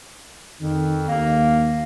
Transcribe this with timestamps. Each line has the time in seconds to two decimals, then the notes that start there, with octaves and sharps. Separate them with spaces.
0.61 F2 D#3
1.08 D#2 A#3